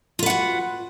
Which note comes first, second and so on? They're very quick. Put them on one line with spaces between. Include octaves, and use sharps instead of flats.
F4 B4 F#5 F#4